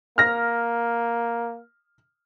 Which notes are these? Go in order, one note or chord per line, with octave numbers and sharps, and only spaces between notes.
A#3 F6 A#6